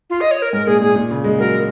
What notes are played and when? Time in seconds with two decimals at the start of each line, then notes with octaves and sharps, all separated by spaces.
0.10 F4
0.21 D#5
0.31 C#5
0.42 A#4
0.53 G#2 A#4
0.67 A#2 G#4
0.81 A#2 G#4
0.96 A#2
1.11 C#3
1.24 G#3
1.39 F#3 A#4